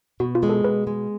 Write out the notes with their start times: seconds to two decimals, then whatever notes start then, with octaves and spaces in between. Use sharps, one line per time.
0.20 B2 F#4
0.35 F4
0.43 G#3
0.49 A4
0.64 B2 B4
0.87 G#3